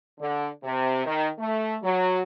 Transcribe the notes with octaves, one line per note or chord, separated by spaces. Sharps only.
D3
C3
D#3
A3
F#3